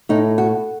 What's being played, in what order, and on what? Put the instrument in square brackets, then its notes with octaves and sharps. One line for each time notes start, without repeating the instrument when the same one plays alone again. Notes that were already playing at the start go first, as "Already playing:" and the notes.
[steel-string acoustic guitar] A2 D#4
F#4